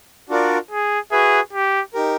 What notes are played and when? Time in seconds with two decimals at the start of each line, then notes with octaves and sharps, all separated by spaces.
0.29 D4 F4 F#4 A#4 D5
0.71 G#4
1.11 F#4 G#4 B4 E5
1.53 G4
1.94 D#4 G4 A#4